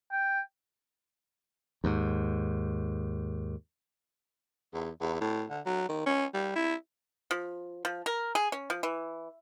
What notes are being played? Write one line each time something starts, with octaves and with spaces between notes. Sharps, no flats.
G5
D#2 G#2
E2
E2
A2
D3
F#3
D#3
C#4
G3
E4
F3
F3
A#4
G#4
C#4
F3
E3